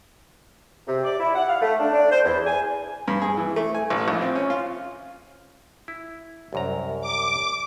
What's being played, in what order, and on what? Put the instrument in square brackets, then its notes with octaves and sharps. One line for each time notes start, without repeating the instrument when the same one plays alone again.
[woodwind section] C3
D5
E4
F#5
F5
A3
D4
D4
C5
E2
G#5
[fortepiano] G2
G#4
E3
A3
G#5
A1
A#1
C4
C#4
F4
[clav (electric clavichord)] E4
C2 F#2 A#5
[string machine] D6